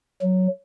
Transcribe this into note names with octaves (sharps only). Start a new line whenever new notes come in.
F#3